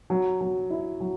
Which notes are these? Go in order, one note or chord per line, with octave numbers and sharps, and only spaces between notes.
F#3
F#3
E4
F#3